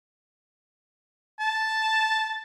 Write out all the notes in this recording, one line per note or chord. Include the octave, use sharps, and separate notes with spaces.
A5